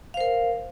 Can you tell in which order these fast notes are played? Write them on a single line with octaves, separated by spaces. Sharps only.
F5 C5 A#4